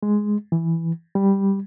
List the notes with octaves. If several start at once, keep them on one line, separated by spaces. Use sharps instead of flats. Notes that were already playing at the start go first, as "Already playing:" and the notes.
G#3
E3
G3